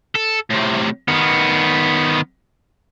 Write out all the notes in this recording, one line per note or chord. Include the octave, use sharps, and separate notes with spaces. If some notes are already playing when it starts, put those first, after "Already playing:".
A4
A2 C3
D#3 B3